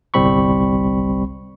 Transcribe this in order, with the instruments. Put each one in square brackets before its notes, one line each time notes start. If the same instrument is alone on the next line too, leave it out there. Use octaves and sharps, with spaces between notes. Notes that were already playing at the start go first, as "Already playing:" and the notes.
[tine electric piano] G1 C2 G3 C4 B5 C#6